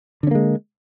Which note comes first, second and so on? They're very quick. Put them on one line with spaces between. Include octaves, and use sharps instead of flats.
D3 C#4 A#3 G#3